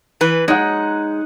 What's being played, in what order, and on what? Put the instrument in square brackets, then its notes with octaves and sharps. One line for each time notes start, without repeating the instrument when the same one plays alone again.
[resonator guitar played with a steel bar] E3 B4
[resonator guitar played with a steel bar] G#3 [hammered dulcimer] D#4 F#5